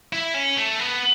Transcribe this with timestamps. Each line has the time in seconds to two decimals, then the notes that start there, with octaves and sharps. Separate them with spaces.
0.13 E4
0.34 C#4
0.57 A3
0.79 B3